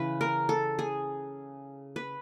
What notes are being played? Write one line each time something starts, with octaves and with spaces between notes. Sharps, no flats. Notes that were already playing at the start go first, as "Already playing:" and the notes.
Already playing: C#3 E3 B4
A#4
A4
G#4
B4